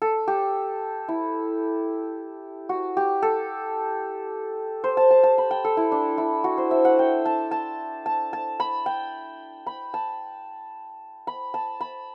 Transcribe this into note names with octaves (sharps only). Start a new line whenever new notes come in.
A4
G4
E4
F#4
G4
A4
C5
A5
A5
A5
B5
G5
A4
E4
D4
E4
F#4
C5
E5
F#5
G5
A5
A5
A5
A5
B5
G5
B5
A5
B5
A5
B5